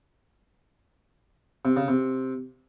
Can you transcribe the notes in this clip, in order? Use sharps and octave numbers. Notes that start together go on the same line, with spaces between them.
C3
C#3
C3